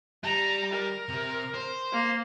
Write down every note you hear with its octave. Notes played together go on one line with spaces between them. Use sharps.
G3 A#5
A#4
C3
C5
A#3